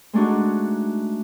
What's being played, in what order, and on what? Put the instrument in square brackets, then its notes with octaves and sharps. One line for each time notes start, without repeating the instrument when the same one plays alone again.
[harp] G#3 A3 D4 D#4 F#4